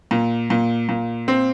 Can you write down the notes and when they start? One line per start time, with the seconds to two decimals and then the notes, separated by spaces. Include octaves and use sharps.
0.11 A#2
0.50 A#2
0.89 A#2
1.28 C4